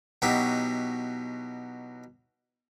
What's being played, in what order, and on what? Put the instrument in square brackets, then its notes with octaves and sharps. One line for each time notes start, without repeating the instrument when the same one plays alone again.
[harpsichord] B2 F#3 D#4 E4 G4